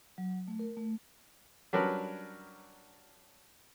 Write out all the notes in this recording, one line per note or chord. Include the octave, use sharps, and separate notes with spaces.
F#3
A3
A#4
A3
F#3 G3 C#4 D4 A#4 B4